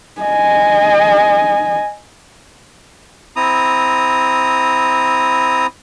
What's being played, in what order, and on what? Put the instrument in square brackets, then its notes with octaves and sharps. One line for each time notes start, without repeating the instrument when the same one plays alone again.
[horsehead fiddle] D#5 G#5
[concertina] C4 E4 A#5 D#6